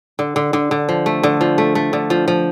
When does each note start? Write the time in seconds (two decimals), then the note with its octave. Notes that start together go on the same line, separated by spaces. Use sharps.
0.19 D3
0.36 D3
0.53 D3
0.71 D3
0.89 F3
1.06 A3
1.23 D3
1.41 F3
1.58 A3
1.75 A3
1.93 D3
2.10 F3
2.28 F3